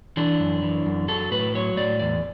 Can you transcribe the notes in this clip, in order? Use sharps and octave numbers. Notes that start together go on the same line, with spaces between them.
E3 D4
F#2
E3
F#2
F#3 A4
A2 B4
F#3 C#5
A2 D5
E2 D5